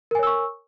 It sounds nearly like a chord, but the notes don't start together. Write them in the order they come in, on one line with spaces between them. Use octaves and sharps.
A#4 G#5 C#5 E6 C#6